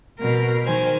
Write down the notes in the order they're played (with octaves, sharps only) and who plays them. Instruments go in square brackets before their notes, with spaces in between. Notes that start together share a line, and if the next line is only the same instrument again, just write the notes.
[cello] B2 A#4
[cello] D#3 [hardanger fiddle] C5 G#5